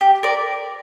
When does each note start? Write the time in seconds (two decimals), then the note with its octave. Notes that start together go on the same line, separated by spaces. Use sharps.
0.01 G4
0.23 A#4 D5